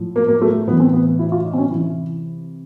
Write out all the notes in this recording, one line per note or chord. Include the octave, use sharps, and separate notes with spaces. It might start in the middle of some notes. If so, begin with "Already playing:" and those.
Already playing: A2 F3
A#3
A#3
A3
A2 E3 B3
C4
B3
E4
F4
D#4
C4
C#4
C3 E3 E4